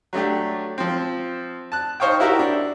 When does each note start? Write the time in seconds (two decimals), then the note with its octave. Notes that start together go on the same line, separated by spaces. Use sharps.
0.13 F#3 A3 D4 G4
0.78 F3 C4
1.72 A5 F#6
2.00 D#4 C5 C#5 F5 G5
2.20 E4 F#4 G4 A#4 E5
2.39 D4